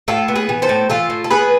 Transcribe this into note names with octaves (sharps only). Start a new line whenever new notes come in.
A2 F4 A4
B3
G#4 B4
E3
A4 C5
A2
E3 F4 A4
A2
A4
B3 G#4 B4